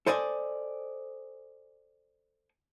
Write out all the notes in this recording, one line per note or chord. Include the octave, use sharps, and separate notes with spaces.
A4 C5 D5 D#5 F#5 G#5